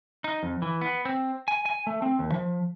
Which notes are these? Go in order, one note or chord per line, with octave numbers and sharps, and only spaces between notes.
D#4
F2
E3
B3
C4
G#5
G#5
A3
C4
D#2
F3